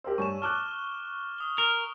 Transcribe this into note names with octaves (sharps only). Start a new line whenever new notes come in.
G4 A#4 C5 E6
G2 C#5 G#5 C#6 E7
A5 D6 F6 F#6 E7 G7
D#6 G7
A#4